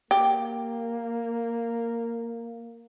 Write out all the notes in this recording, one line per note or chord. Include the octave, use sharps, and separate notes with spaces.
A#3 G4